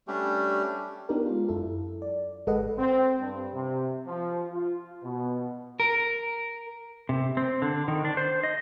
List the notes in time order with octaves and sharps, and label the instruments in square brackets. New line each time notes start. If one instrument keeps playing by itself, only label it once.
[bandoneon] G3 A3 C#4 D4 G4
[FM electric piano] B3 D4 D#4 G4 A#4
G#3 F4
F#2 E4 A4
D5
G#1 G#3 A4 B4 D#5 F#5
[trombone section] C4
G2
C3
F3
F4
B2
[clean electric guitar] A#4
[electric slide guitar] C3
C4
D3
D#3
D4
C5
D#5